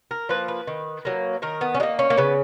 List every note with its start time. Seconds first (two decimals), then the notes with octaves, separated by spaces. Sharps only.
0.11 A#4
0.29 F3 A#3 B4
0.48 B4
0.67 D#3
1.05 F#3 A#3
1.42 D#3 A#4
1.61 B3
1.74 C#4
1.80 F#3 A#3 D#4
1.99 C#4
2.10 A#3
2.17 C#3 B3